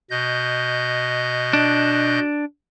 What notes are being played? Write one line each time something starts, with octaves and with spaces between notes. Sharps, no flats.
B2 D#5 G6
D4